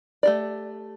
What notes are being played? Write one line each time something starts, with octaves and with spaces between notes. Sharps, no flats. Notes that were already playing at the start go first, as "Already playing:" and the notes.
A3 G4 D5